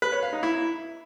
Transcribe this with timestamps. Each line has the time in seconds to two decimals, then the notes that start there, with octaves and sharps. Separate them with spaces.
0.02 B4
0.12 C#5
0.22 F5
0.33 D#4
0.43 E4